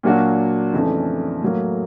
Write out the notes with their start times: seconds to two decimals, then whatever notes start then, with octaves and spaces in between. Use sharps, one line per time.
0.03 A#2 F#3 A#3 D4 F#4
0.73 F2 C#3 E3 A3 D4
1.42 A2 F#3 A#3